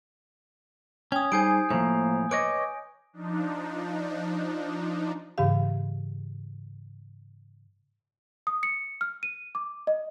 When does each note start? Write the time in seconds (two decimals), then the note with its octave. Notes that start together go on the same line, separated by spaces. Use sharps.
1.12 C#4 G5 D#6 G#6
1.32 G3 D#4 G#4 C5 G#5 G6 D7
1.70 A2 C3 F3 A#3 C5
2.31 B4 C#5 D#5 D6 D7
3.13 F3 D4 D#4
5.38 G#2 C#3 E3 G4 F5
8.47 D#6
8.63 C#7
9.01 F6
9.23 D#7
9.55 D6
9.87 D#5